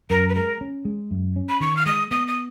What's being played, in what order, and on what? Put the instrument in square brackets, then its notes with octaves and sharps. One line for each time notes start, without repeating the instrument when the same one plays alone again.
[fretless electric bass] F#2 [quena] A#4
[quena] B4
[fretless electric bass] G#3 [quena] A#4
[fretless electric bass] C#4
G#3
F#2
C#4
[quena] B5
[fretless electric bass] D#3 [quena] C#6
[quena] F6
[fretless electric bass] G#3 [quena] D#6
[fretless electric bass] B3 [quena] D#6
[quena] D#6